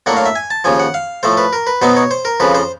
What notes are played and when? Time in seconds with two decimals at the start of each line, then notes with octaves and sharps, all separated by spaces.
0.06 A2 F#3 A#3 D4 F#5
0.17 F5
0.26 E5
0.35 G#5
0.50 A5
0.64 D#2 C#3 F3 G#5
0.79 F#5
0.94 F5
1.23 A2 F3 A3 C5
1.37 B4
1.53 A#4
1.67 B4
1.82 B2 F#3 B3 D#4 C5
1.96 C#5
2.11 C5
2.25 A#4
2.40 F2 C#3 F3 B4
2.55 C5